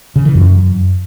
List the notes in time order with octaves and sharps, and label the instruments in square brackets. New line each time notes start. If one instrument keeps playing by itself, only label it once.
[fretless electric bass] C#3
E3
F#2